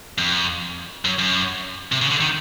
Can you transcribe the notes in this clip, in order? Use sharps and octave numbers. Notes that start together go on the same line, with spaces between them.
F2
F#2
F#2
C3
C#3
D3
D#3